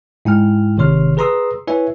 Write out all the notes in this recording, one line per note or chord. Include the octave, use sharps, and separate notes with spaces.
G#2 E4 G5 F6
G#1 C3 D#3 C#5 C6 F6
G#4 B4 A#5 C6 D#6 E6
E4 B4 C#5 E5 G#5